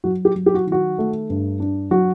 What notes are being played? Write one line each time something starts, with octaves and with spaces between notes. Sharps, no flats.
F#3 F#4
G4
F#3
G4
F#4
D#3
F#4
A3
G2
D4
F#3 F#4